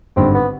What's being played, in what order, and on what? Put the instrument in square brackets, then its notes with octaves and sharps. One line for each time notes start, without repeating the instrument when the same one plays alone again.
[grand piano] G#1 G2 D3 [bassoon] C4
[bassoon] B3